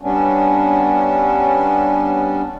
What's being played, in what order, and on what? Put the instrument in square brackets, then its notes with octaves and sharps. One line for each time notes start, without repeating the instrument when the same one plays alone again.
[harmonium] G3 B3 C#4 D4